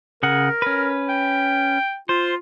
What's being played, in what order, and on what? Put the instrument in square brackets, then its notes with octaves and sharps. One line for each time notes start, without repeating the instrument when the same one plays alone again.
[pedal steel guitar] C#3 G#4 F#5 [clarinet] A#4
[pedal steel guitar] C#4 B4
[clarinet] G5
[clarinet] F4 [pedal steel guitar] C5